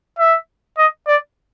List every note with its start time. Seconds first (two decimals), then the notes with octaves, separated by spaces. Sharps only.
0.19 E5
0.78 D#5
1.07 D5